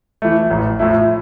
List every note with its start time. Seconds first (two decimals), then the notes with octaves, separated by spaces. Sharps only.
0.22 E3 A3
0.51 A1
0.79 A2 F3 A3 E4